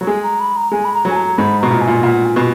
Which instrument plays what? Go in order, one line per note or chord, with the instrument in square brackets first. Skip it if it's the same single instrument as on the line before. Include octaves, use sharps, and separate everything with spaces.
[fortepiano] F#3
[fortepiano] G#3 [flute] G#5
[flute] A#5
B5
A#5
[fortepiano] G#3 [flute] G#5
[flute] B5
A#5
[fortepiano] F#3
[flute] G#5
A#5
[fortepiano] G#2 [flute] B5
[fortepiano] B2 [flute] A#5
[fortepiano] A#2
[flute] G#5
[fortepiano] A#2
[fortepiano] A#2 [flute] F#5
[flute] G#5
[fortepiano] B2